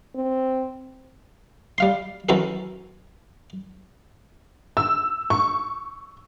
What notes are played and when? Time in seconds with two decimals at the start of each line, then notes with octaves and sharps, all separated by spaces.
0.15 C4
1.78 G3 F5 C6
2.29 E3 F#3 C4 C#4 A4 A#4
4.77 E6
5.30 C#6